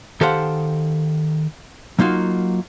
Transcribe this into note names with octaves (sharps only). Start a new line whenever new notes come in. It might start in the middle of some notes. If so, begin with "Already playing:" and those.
D#3 G4 A4 C5 F5 F#5
F#3 A#3 D#4 F4 F#4